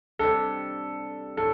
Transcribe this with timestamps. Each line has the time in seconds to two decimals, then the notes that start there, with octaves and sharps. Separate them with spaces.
0.19 C3 G3 D4 A4
1.37 A2 A4